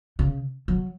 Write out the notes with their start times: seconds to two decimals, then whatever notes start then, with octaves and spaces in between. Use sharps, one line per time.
0.19 C#3
0.68 F#3